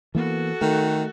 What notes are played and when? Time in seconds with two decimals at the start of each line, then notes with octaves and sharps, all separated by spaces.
0.15 E3 A#3 B3 F#4 A4
0.61 D#3 A3